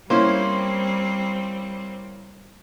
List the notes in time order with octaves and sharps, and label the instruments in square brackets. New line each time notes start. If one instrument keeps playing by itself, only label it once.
[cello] G3 C4 [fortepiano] A#3 C#4 E4 [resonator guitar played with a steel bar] C5